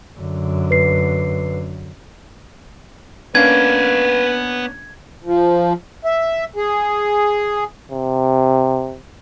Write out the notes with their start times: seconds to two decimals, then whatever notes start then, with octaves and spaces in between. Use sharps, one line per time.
0.19 F#2 D3
0.70 B4 C7
3.35 A#3 B3 C#4 D4 B4 F5 G#6
5.24 F3
6.05 E5
6.56 G#4
7.92 C3